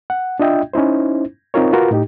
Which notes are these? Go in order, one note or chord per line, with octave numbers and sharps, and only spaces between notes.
F#5
D4 F4 D#5 E5 G5
C#4 D#4 E4 C5
C4 D#4 F4 A#4 C#5
F4 F#4 A#4 B4
A2 D#4 G4